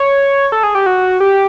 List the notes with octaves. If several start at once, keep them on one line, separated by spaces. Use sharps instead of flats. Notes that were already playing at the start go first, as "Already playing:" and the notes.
Already playing: C#5
A4
G#4
G4
F#4
G4